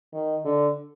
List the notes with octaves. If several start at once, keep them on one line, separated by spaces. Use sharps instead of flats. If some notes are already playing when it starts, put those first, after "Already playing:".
D#3
D3